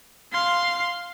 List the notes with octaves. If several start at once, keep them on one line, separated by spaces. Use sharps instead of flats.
F5 C6